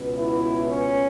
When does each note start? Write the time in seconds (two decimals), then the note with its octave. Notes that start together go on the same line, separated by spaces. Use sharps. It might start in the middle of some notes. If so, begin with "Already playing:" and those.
Already playing: C#2 B2 B3
0.18 E4
0.66 C#4